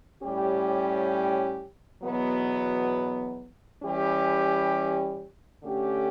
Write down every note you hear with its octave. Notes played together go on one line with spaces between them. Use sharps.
A2 G3 C#4 G4
E2 B2 F#3 B3
E3 G3 C#4 G4
D3 A3 C#4 G4